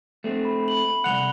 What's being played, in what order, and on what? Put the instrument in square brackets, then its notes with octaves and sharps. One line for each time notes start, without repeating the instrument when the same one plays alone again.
[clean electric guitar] A3 C4
[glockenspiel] B5
B5 F#7
[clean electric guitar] C2 F3 F#5 [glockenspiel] F#6 F7 G7